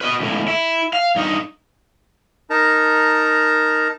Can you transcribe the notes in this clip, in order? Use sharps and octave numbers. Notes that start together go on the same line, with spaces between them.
B4 D#5
C#2 A2
E4
F5
G2 D#4
D#4 A#4 A5 A#5